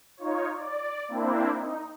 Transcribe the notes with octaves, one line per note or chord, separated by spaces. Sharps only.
D#4 F4 C#5
D5
A#3 C4 D4 E4
D#4